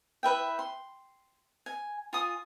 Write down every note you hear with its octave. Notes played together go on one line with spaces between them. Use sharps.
E4 B4 E5 G5
C6
G#5
F4 G#5 D#6